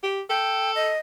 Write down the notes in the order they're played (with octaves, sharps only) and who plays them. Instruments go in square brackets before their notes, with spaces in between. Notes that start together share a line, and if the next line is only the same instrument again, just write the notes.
[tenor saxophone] G4
[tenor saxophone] A4 [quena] G5
[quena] D#5